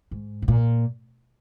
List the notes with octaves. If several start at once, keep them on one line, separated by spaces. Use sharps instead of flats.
G#2
C#3
A#2